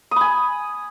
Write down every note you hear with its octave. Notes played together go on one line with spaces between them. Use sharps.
G#5 B5 D#6